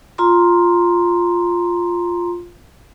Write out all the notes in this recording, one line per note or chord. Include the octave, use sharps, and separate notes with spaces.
F4 A#5 C6